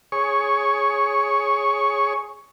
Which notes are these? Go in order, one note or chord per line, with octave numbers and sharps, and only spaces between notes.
G#4 C#5 C#6